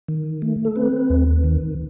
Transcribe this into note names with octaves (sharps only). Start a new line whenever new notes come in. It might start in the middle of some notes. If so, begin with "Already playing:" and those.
D#3
A3
A4
C4 B4
D#2
D#3